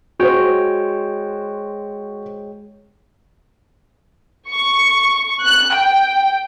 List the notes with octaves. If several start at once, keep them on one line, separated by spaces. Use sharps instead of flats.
G#3 F#4 C5 C#5 G5
C#6
F#6
G5